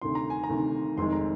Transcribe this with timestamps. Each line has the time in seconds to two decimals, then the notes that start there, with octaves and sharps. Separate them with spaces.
0.02 D2 C3 D#3 C6
0.15 A#5
0.30 G#5
0.44 A#5
0.49 D2 C3 D#3
0.97 F1 F2 D#3 G#3 C6
1.12 A#5